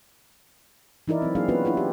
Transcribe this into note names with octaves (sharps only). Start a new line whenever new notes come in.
E3 D#4 E4 A#4 D5
F#3 C4
F#3 A#3 C4 D4 G#4 F5
B3 C#4 D4 F4 F#4 B4
D4 E4 F4 B4
G4